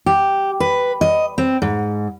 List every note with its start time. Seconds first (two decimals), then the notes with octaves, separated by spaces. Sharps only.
0.06 G4
0.60 B4
1.01 D#5
1.38 C4
1.62 G#2